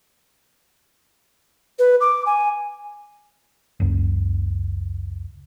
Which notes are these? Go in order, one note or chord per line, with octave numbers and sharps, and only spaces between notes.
B4
D6
G#5
F#1 C#2